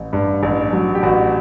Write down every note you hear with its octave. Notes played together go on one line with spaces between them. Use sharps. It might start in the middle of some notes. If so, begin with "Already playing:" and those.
Already playing: A1
G2
A1
F#3
G4
A1 F#4